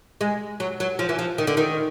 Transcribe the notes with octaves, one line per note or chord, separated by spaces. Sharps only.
G#3
F#3
F#3
F3
E3
F3
D#3
D3
D#3